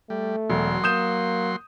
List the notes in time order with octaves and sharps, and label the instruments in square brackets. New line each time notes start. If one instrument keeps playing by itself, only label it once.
[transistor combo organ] G3 [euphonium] A3
[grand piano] E1 [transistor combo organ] F#3 C6
[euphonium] A#3 [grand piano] D#6 G6 E7